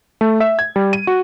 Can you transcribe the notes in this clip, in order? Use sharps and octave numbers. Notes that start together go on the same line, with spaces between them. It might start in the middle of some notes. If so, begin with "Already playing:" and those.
A3
E5
G#6
G3
D#7
F#4